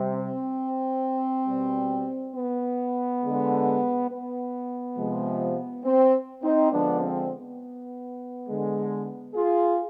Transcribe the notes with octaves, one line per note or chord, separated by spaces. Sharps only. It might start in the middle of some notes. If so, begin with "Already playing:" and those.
Already playing: C3 G3
C4
B2 G3
B3
D3 G#3
B3
C3 F3 G#3
C4
C4 D#4
D3 F3 G#3 B3 D4
C4
B3
D3 G#3
F4 G#4